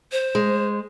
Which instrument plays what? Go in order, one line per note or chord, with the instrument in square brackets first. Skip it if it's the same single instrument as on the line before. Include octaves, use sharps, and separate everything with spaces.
[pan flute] C5
[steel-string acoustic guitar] G#3